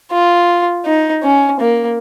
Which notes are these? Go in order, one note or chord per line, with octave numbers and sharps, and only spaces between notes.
F4
D#4
C#4
A#3